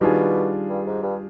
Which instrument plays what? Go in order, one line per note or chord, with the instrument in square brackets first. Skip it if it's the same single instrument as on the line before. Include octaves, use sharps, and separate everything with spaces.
[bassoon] B2 [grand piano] D#3 G3 D4 F4 G#4
[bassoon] G2
G#2
G2